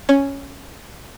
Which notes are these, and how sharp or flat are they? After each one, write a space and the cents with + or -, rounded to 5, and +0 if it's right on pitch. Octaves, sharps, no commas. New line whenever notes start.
C#4 +0 C#5 +0